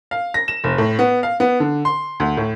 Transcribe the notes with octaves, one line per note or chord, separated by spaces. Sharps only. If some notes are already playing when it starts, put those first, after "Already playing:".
F5
A#6
E7
F1
A2
B3
F5
B3
D3
C6
D2
A2